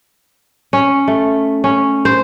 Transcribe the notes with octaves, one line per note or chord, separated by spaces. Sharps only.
C#4
A3
C#4
C5